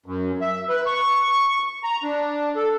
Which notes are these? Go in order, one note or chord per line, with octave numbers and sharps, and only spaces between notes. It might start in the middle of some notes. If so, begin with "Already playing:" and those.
F#2
E5
B4
C#6
A#5
D4
A4